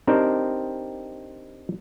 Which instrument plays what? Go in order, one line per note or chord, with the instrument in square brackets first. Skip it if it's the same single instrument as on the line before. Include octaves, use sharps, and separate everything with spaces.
[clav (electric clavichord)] C4 D4 D#4 G4 A#4 C5